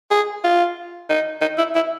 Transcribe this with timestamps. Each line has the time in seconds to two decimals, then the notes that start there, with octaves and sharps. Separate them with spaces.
0.11 G#4
0.44 F4
1.10 D#4
1.41 D#4
1.58 E4
1.75 E4